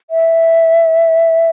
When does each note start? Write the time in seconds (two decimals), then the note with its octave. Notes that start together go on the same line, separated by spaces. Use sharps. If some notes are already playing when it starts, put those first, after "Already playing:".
0.10 E5